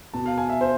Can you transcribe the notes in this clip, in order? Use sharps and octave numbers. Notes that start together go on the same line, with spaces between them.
B2 A5
F5
G#5
E5
C5